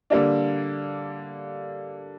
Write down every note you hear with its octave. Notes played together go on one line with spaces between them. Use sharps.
D3 G3 A#3 D4